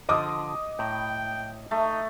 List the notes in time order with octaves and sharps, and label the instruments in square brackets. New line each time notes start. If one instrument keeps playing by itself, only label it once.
[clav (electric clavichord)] D3 F3 A5 [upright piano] D#5 D6 D#6
[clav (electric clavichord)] A2 A#5 [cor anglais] G5
[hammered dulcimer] A3 [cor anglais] D#4